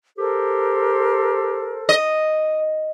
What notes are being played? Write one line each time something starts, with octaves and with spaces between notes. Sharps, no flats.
G4 A4 A#4 C5
D#5